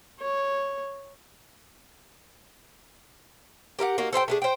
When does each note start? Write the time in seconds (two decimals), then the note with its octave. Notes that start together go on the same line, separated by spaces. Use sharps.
0.20 C#5
3.79 G4 A#4 E5 F#5
3.98 A#3 D#4 F#4
4.13 A4 C5 E5 G5
4.28 A3 D4 G#4
4.42 C5 G5